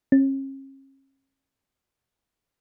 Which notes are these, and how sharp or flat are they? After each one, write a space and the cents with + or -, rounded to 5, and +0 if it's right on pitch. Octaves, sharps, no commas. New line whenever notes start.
C#4 -40